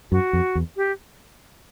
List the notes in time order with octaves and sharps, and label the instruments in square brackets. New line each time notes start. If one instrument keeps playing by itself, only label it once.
[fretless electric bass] F#2 [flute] F#4
[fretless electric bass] F2
E2
[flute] G4